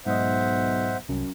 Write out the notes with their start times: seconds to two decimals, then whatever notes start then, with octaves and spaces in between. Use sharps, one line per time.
0.06 B1 G#2 C5 D#5 E5 F#5
1.09 C2 F#2